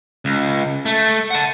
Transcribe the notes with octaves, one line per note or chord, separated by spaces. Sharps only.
C#2
A3
F#5 A5